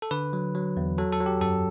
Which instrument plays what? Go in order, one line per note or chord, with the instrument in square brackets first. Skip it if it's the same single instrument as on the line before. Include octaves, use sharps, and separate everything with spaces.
[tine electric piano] A4
D3 B4
F#3
F#3
E2
F#3 A4
A4
F#3
G4
F#2 A4